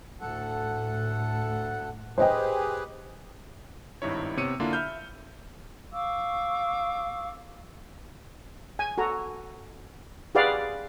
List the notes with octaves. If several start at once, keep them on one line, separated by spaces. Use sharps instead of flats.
D2 A2 A4 F#5
G4 G#4 B4 C5 D#5 G5
G#1 G2 D#4 E4 C#5
C3 B3 C#5 E6 C#7 D#7
D3 A#3 D4 E4 F4
E5 B5 F6 G6
F5 C#6 D6 E6
G#5
F#4 A4 A#5
G4 G#4 B4 D5 F5 F#5